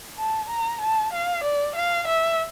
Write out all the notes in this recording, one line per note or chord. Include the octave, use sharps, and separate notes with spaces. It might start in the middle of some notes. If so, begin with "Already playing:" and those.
A5
A#5
A5
F5
D5
F5
E5